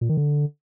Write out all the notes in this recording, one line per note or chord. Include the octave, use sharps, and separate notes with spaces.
A#2
D#3
D3